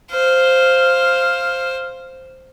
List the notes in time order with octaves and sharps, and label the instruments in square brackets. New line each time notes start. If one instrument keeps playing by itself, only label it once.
[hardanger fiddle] C5 [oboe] F5